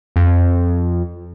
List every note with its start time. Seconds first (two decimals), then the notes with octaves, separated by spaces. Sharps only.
0.16 F2